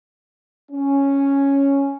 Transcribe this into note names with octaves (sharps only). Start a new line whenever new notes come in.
C#4